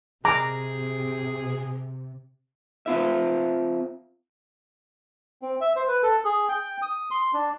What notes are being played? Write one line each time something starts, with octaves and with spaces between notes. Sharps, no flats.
C3 G#4 A#5 D6
C4 F4 E5
C4
E5
C5
B4
A4
G#4
G5
D#6
C6
D4